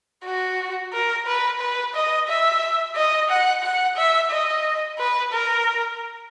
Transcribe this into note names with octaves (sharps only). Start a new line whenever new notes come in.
F#4
A#4
B4
B4
D#5
E5
D#5
F#5
F#5
E5
D#5
B4
A#4